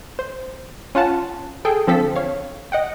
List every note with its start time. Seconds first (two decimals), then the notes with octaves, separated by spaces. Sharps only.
0.19 C5
0.95 C#4 F4 F#5 A5
1.65 G#4 A4 G5
1.87 D3 F3 C4 A4 B6
2.16 C#5 F5
2.72 D#5 F#5 G5